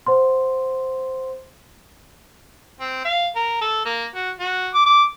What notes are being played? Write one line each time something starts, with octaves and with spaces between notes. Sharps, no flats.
C5 F#5 C6
C4
F5
A#4
A4
A#3
F#4
F#4
D6
D6